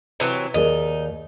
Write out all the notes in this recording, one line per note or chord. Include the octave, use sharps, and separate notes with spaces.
C3 E3 F#3
D#2 D#4 G#4 D5